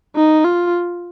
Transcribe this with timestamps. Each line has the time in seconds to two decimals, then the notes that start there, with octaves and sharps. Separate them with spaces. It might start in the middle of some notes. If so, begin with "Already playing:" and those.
0.16 D#4
0.44 F4